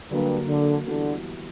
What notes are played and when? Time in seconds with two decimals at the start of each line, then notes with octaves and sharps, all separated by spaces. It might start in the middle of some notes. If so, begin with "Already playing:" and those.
0.10 G2 D3 F#3 A#3
0.48 D3
0.86 D3 E3 G3 B3 F#4